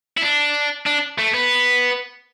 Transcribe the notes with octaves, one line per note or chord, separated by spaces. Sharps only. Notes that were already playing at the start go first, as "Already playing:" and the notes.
E4
D4
D4
A3
B3